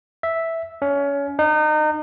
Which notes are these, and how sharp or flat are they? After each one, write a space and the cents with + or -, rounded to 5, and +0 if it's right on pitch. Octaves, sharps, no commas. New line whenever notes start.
E5 -5
C#4 +25
D#4 -30